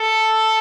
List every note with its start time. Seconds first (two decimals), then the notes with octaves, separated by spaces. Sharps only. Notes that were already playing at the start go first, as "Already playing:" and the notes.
Already playing: A4